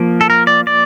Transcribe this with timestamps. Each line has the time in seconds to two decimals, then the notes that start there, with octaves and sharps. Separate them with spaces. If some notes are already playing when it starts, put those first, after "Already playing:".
Already playing: F3 A#3
0.21 A4
0.30 A#4
0.47 D5
0.67 D5